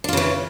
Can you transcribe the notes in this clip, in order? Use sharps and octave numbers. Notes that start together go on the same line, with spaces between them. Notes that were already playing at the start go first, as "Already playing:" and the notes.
C#3 E3 D4 F4